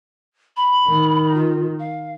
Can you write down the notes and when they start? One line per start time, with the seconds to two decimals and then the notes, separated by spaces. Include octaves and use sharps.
0.57 B5
0.88 D#3
1.34 F4
1.79 F5